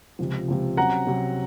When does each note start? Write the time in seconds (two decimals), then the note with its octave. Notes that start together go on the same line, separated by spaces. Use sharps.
0.19 C#2 C3 F3
0.48 C#2 C3 F3
0.77 C3 F#3 C#4 F#5 A#5
1.07 C3 F#3 C#4